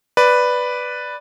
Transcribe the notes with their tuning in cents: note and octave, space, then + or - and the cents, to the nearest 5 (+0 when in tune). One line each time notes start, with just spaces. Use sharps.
B4 +0 D5 +0